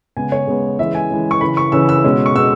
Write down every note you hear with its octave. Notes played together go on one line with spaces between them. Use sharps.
C#3 G#3 B3 G#5
C#5
C#3 G#3 B3
E3 G#3 C#4 E5
G#5
E3 G#3 C#4
C#6
C#3 E3 C#4 B5
C#6
C#3 E3 C#4 E6
E6
B2 G#3 C#4
C#6
B2 G#3 C#4 E6